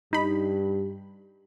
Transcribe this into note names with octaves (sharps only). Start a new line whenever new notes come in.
G2 D#4 B5